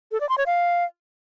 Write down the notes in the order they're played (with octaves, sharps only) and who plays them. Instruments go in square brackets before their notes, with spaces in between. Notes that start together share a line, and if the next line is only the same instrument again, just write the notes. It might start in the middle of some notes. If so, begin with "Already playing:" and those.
[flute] A4
D5
C6
C#5
F5